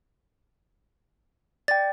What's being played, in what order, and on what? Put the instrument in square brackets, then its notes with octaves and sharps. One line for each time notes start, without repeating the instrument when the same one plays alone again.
[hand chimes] D5 G5 [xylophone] A6